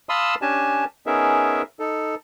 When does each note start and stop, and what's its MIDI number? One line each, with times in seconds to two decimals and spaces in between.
0.09 0.35 77
0.09 0.35 81
0.09 0.35 83
0.09 0.35 84
0.09 0.35 87
0.09 0.35 88
0.42 0.85 61
0.42 0.85 62
0.42 0.85 67
0.42 0.85 80
0.42 0.85 81
1.06 1.62 59
1.06 1.62 61
1.06 1.62 63
1.06 1.62 68
1.06 1.62 70
1.06 1.62 76
1.79 2.15 63
1.79 2.15 69